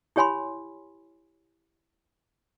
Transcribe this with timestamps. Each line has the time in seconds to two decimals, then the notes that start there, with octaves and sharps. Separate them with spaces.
0.16 E4 G4 C#5 G#5 B5 C6